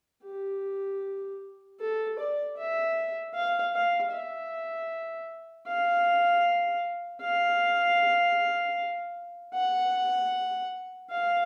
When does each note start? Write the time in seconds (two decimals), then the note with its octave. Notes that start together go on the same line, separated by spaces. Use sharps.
0.24 G4
1.80 A4
2.19 D5
2.57 E5
3.34 F5
3.74 F5
4.12 E5
5.68 F5
7.22 F5
9.55 F#5
11.10 F5